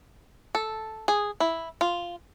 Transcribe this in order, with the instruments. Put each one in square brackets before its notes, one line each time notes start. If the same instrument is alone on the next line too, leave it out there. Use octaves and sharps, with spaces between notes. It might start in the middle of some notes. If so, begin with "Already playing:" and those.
[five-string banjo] A4
G#4
E4
F4